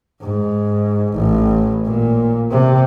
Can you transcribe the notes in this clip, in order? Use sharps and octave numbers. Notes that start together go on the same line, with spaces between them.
G#2
A1
A#2
C3